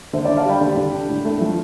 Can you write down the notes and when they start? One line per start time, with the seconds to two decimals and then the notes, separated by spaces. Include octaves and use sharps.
0.13 D3 C5 E5
0.25 D4 D5
0.37 F5 A5
0.45 G3 G5 B5
0.61 D3
0.77 D3
0.92 D4
1.09 A2
1.25 A3
1.41 F3